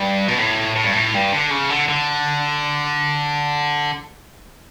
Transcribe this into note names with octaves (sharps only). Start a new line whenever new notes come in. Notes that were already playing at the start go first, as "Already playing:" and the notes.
Already playing: G2
B2
A2
A2
G2
A2
G2
D3
C#3
D3
D3